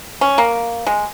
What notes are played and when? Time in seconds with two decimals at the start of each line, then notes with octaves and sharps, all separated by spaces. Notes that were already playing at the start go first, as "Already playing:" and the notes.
0.21 C#4
0.38 A#3
0.87 G#3